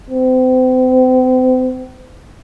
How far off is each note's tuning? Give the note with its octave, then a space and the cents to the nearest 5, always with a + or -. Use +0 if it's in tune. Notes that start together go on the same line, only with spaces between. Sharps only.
C4 -35